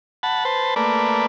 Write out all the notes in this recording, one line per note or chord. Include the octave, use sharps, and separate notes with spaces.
F#5 A5 B5
B4 C5 A5
A3 A#3 B4 D5